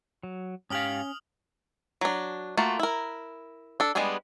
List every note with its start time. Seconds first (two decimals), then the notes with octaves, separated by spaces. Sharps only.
0.23 F#3
0.70 G#2 C#4 G4 F5 D#6 F6 F#7
2.01 F#3 D4
2.57 A3 A#3 F4 F#4
2.79 E4 A#4
3.80 D4 A4
3.95 G3 G#3 B3 D4 G#4